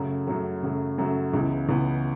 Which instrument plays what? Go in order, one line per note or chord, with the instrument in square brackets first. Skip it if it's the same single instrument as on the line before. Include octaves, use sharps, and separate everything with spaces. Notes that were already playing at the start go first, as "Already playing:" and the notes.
Already playing: [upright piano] F#2 C#3 F#3 A3
F#2 C#3 F#3 A3
F#2 C#3 F#3 A3
F#2 C#3 F#3 A3
C#2 C#3 E3 B3
C#2 C#3 E3 B3